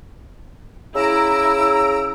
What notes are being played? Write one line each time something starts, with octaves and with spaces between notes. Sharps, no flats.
C#3 E4 A#5 E6 D7